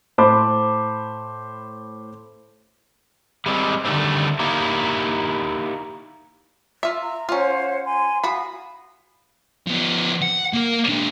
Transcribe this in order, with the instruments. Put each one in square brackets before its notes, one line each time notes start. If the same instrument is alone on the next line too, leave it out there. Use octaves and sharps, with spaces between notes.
[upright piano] A2 C5 A5 B5 D6
[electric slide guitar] G3 G#3 C4
D3 D#3 G3 A3 C4
A#3 D#4 E4 G4
[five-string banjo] F4 E5
[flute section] A#5
[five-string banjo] C#4 F4 [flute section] C5 C#5 F#5
[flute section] G#5 C6
[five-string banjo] F#4 B5 [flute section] F5 D#6
[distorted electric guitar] F3 B3
F#5
A#3 A#4
G#3 D4